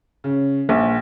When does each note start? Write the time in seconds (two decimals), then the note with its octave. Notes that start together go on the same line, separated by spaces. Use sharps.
0.24 C#3
0.69 A#1